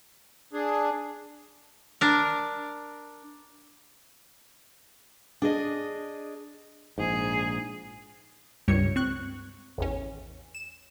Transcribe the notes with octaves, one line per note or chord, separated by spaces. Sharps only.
D4 G#4
D4 A#4
D4 G#4 D#5
A#1 G#2 G#4
C#2 G2 G3 C#5 C#7
C4 C#6 F#6
A1 E2 C#4
E7